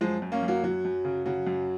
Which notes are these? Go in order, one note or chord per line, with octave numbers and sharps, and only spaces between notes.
F#2 F3 G#3
F#2
A#3 C#4
F#2
F#3 A#3
F#2 F#3
F#2
C#3
C#3 F#3
F#2